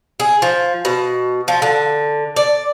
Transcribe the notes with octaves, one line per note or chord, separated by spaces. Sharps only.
G#4
F3
B2
F3
D3
D5